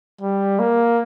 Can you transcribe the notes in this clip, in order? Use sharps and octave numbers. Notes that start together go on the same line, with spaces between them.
G3
A#3